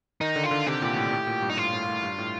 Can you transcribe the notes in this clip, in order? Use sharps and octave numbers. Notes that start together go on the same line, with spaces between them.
D#3 D#4
D3
F4
D3
C3 G4
A#2
A2
A2
A#2
G2
D#4
A2 F4
A2
A2
G2
A2